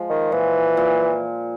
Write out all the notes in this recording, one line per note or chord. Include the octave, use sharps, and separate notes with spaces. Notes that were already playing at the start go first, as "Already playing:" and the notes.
Already playing: F3 G#3
D#3
A#2 E3
A#2